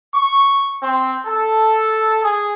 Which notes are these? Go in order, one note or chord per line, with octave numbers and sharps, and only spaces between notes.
C#6
C4
A4
G#4